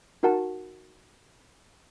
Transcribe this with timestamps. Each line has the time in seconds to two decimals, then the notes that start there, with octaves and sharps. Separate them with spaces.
0.23 D#4 F#4 A#4 F#5 A5